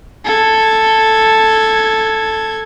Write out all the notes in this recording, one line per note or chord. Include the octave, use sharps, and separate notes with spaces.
A4 G#6